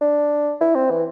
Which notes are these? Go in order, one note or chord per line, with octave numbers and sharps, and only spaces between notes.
D4
E4
C4
E3